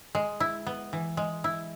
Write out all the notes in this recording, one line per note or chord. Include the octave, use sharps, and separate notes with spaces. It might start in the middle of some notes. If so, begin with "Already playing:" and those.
G#3
E4
B3
E3
G#3
E4